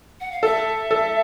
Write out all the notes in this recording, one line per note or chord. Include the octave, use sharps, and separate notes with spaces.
F#5
F5
A4 E5
A4